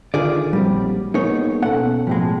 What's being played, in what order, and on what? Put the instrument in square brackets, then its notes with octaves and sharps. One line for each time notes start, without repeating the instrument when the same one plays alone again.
[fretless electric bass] D3 D#3 [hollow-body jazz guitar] F4 G#4 D5
[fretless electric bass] A#1 F#3 C4 [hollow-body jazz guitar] G3
[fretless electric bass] A#3 B3 [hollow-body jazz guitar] D#4 G#4 C#5
[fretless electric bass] B2 B3 C#4 [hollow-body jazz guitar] A4 F#5
[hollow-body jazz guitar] F2 A2 G#3